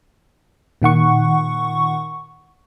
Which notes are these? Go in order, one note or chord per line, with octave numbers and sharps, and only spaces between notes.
A#2 D#3 F#5 C#6